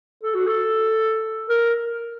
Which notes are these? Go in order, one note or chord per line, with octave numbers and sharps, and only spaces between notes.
A4
F#4
A4
A#4